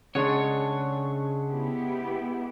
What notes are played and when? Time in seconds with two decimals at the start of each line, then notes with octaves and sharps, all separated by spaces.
0.15 C#3 G#3 D4 C#5 F#5
1.49 B3 E4 G4